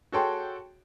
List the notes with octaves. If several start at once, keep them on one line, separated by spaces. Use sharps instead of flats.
F#4 G#4 A4 C#5 G5 C6